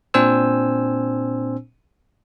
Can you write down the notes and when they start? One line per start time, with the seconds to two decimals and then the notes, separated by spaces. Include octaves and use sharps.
0.14 A#2 C4 D4 C5 G#5 E6